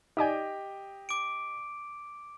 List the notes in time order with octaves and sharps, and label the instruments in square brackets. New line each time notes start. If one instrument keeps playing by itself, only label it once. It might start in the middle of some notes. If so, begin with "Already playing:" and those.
[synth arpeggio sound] D#4 D5 G#5 [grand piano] G4 D#5 G5
[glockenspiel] D6 D7